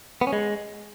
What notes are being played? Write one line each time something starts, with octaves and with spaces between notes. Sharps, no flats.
B3
C#4
G#3